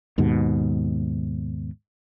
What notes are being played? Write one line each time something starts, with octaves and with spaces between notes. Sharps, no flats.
D#2 G#2 B2